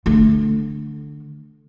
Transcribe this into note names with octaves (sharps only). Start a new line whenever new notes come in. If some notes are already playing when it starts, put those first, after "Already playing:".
D3 A3